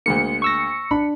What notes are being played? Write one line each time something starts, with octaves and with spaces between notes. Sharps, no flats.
D2 G#3 A#3 C#7
C#6 E6 A#6
D4 B5